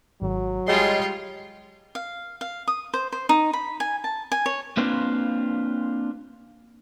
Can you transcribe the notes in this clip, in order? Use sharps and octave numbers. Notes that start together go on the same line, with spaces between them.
G#1 F#3
G3 G#3 F4 G#4 C#5 D#5 C6 C7
F5
F5
D#6
C5
C5
D#4
B5
G#5
A5
G#5
C#5
A#3 C4 D4 F4 B4 C5